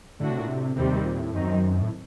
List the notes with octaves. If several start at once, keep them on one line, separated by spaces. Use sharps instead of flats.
A2 D3 A3 D4 F#4
C3
A#2
C3
D#2 C3 D#3 G3 C4
A#2
A2
F#2 D#3 F#3 C4 D#4
A2